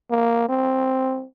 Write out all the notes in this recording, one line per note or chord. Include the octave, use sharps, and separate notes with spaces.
A#3
C4